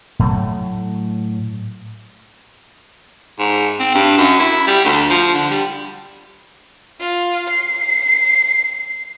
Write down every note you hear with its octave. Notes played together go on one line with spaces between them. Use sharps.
A2 F#3 A3
G#2
C4
G2
F#2
E4
G3
D2
F3
D3
G3
F4
C7